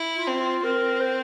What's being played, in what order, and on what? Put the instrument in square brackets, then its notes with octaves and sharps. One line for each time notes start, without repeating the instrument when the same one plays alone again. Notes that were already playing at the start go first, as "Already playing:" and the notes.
Already playing: [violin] E4
[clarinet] F4
[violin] C4
[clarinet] F4
[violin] C4 [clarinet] A#4
[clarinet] C5